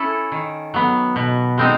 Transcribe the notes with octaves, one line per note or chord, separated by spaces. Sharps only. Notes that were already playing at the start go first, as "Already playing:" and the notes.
Already playing: C#4 E4 A4
D#3
F#3 B3
B2
G#3 C4 D#4